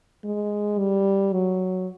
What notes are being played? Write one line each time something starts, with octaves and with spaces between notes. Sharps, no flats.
G#3
G3
F#3